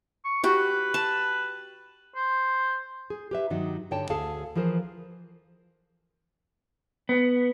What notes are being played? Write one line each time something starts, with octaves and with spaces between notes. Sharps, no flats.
C#6
F#4 G4 B4
A5
C5
G#4
G4 B4 E5
G2 D#3 F#3 D#4
G2 D3 C#5 G5 A5
D2 G#4 A4 F5 A5
E3 F3 G#4 A#4 C5
B3